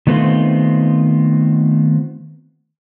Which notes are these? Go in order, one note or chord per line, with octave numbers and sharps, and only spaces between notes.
D#3 A3 B3 C4 F4 C5